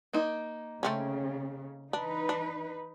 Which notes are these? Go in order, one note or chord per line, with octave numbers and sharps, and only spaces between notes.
A#3 D#4
C#3 A3 C4 C#4
E3 D4 D#4 B4
D4